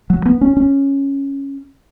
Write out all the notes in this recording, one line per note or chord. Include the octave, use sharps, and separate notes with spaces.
F#3
B3
C#4
C#4